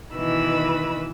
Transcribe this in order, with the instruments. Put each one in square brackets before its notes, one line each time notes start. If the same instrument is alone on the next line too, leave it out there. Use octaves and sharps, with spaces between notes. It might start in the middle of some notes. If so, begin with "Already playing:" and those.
[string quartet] B2 D#3 E3 B4 B5 E6